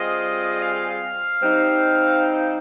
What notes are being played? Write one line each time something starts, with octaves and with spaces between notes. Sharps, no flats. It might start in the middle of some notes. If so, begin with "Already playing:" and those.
Already playing: G3 C4 F4 G#4 D#5
F5
G3 C4 D#4